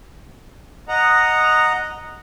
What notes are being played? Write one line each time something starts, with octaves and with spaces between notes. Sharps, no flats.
D#5 F#5 A#5